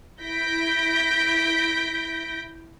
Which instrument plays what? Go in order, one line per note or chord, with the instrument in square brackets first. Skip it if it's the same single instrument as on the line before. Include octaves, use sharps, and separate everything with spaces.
[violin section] E4 G6 A#6 B6 D7